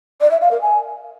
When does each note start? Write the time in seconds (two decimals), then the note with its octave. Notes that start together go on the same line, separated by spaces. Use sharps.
0.21 D5
0.31 E5
0.41 F5
0.51 A#4
0.61 G#5